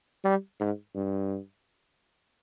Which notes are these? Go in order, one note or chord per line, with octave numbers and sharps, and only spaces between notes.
G3
G#2
G2